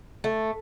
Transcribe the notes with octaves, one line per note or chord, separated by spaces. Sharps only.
A3